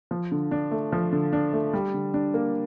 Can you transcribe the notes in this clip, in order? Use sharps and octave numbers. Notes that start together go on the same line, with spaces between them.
F3
D3
D4
A3
F3
D3
D4
A3
G3
D3
D4
A#3